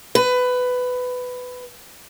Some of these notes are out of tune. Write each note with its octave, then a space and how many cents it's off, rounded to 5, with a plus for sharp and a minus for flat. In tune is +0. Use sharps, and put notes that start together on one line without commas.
B4 +15